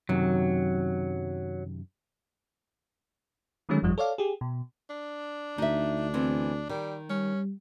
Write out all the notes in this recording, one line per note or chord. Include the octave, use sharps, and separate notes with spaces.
F#2 C3 D#3 F#3
D3 D#3 F#3 G#3 A3 C#4
G1 F2 F3 G3
A4 C#5 D5 F5
G4 G#4
B2
D4
D2 D#4 E5
E3 B3 C4
D#3 G3
G3 C#4